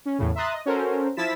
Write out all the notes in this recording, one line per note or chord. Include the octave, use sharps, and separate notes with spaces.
C#4
E2 A2 C#3
E5 A#5 C6 D#6 F#6 A6
D#5
C#4 F#4 A4 A#4 C5
F3 E4 E6 A6 B6 E7